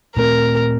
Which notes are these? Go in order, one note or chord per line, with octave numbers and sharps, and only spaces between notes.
A#2 A3 C4 A#4